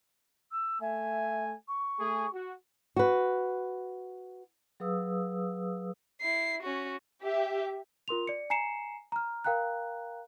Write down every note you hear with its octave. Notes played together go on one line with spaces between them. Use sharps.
E6
A3 E5 G#5
C#6
A3 G#4
F#4
F#4 B4
F#3 G#4 B4 F5 D#6 E6
E4 C7
C#4 F#4
G4 E5
F4 A#4 C6 F7
D5 C#7
G#5 A#5 C7 C#7 E7
A#5 F6
A#4 F5 G5 A#5 F#6